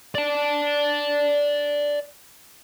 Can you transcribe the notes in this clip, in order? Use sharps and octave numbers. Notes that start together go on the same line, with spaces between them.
D5 A5